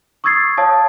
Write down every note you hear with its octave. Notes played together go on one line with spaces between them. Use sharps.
C#6 D#6 E6 G#6 A6 C7
C#5 F5 A5 D#6